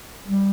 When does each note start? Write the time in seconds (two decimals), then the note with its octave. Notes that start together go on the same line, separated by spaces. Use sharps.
0.27 G3